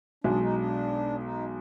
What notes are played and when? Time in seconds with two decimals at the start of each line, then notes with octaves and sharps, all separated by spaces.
0.24 B1 B2 G#3 D4
0.41 D#4
0.57 D4
1.23 D#4